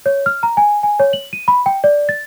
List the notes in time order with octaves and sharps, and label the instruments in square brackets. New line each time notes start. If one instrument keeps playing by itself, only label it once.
[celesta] C#5
F6
A#5
G#5
G#5
C#5
F#7
D#7
B5
G5
D5
A6